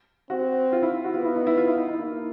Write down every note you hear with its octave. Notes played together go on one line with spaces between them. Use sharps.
C4 F#4
F4
E4
F#4
B3 F4
E4
D#4
E4
F4
E4
D#4
D#4
A#3 E4